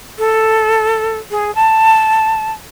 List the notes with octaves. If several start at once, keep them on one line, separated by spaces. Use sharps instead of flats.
A4
G#4
A5